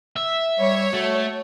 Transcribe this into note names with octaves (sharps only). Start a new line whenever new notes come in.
E5
G3 C#5
A3 F#4